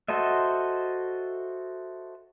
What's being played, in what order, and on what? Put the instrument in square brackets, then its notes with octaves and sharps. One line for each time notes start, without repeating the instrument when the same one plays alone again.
[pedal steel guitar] F#4 A4 C5 D#5 E5